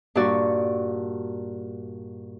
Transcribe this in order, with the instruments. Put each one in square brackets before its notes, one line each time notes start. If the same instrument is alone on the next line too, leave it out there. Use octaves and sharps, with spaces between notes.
[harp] G2 A#2 G3 F#4 D5 C#6